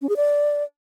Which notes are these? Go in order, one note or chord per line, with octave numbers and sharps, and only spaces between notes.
C#4
G#4
D5